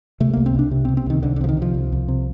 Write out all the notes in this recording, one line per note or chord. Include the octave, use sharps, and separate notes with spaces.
C3 A3
C2 A#3
C4
C2 D4
C3
C4
C3
C4
C2 D#3
C2 D3
D3
C3 F3
D#3
C3 F3
C2
C2
C3